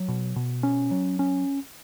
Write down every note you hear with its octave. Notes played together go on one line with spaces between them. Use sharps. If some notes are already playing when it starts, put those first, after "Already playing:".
Already playing: F#3
B2
B2
C#4
F#3
C#4